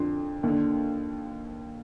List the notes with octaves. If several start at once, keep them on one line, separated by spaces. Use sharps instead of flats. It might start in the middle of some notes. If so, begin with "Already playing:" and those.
Already playing: F2 D3 C6
D#2 D3